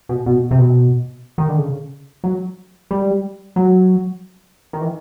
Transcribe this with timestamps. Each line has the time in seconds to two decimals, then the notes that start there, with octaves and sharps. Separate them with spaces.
0.09 B2
0.26 B2
0.51 C3
0.58 B2
1.38 D#3
1.48 D3
1.58 C#3
2.24 F#3
2.91 G3
3.56 F#3
4.73 D#3
4.81 E3